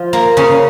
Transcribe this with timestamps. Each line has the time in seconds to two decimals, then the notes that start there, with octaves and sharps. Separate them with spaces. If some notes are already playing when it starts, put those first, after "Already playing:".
Already playing: F3 F4
0.13 A#3
0.37 C#3 C#4